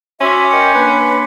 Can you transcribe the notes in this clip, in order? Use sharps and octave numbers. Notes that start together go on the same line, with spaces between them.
C#4 F#4 E5 C6 D6
A#4 D#5 G5 C#7
A#3 D4 B4